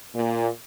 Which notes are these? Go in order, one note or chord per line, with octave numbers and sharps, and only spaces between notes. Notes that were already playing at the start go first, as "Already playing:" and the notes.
A#2